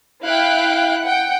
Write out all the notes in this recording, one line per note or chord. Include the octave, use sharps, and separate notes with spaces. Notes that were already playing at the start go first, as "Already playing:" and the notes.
E4 F5 G5 F#6
F#5 G5